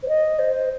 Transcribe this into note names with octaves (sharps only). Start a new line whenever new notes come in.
C5
D#5
C5